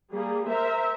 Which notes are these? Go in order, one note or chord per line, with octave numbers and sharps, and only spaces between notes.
G3 A#3 G#4
A#4 C5 E5